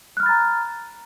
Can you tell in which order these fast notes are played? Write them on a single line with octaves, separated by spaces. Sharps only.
F#6 F6 B5 A6 A#5